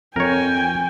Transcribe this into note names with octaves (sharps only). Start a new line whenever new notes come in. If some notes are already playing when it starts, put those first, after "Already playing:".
F2 A#4 C#5 G5 G#5